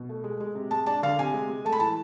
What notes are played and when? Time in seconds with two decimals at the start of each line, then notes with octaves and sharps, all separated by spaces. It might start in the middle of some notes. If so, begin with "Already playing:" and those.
Already playing: B2
0.09 A3
0.24 G#3
0.40 G#3
0.55 C3
0.71 G#3 A5
0.86 D4 A5
1.03 D3 F5
1.18 C3 G#5
1.33 G#3
1.49 G#3
1.65 A3 A5
1.72 B5
1.80 E3 A5